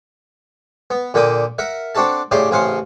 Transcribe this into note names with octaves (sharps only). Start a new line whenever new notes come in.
B3
A#2 D3 A#3 G5 D#6
A#4 E5 F#5
C4 D4 F#4 A4 A5
A2 C#3 G4 D5 C6
A1 C#3 C4 F5 F#5 C6